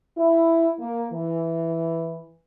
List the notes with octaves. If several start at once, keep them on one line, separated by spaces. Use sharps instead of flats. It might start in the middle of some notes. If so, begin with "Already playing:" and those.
E4
A#3
E3